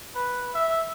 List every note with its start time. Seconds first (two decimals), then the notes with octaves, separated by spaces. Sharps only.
0.15 B4
0.55 E5